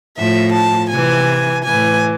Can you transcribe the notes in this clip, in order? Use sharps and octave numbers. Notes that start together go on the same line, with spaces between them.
A2 F3 E5
A5
C3 E3 G#5
A2 E3 G#5